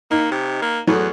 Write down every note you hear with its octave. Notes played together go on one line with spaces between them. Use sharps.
A#3 D#4
C3
A#3
E2 F#3 A3